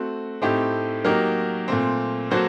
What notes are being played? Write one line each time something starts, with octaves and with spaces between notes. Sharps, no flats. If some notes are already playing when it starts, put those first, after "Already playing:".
Already playing: A3 C4 F#4
A2 A3 C4 D#4 G4
F#3 A#3 D#4 G4 A#4
A#2 A3 C4
F#3 A#3 F#4 A4 C5